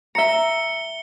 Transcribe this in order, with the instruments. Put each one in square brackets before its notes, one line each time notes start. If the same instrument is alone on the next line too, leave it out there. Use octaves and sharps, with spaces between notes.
[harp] E5 A#5 [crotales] C#7 G7